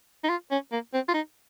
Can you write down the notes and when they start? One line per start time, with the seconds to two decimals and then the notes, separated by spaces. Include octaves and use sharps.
0.24 D#4
0.29 F4
0.51 C#4
0.72 A#3
0.94 C4
1.08 F4
1.14 D#4